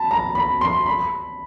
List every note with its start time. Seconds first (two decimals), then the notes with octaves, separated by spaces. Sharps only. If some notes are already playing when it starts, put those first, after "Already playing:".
Already playing: A5 B5
0.11 A#5
0.35 B5
0.61 C6
0.86 B5